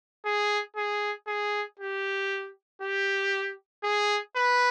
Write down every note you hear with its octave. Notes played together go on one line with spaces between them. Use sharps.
G#4
G#4
G#4
G4
G4
G#4
B4